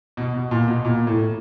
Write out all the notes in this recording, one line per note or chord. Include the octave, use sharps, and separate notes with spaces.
B2
B2
A#2
B2
A#2
A2